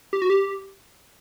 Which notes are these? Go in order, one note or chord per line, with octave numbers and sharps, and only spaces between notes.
G4
F#4
G4